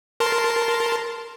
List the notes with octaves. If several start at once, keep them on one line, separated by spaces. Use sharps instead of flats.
A#4 A5 C6